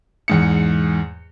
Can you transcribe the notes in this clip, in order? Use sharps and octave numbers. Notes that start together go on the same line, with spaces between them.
E2 G#2 C#7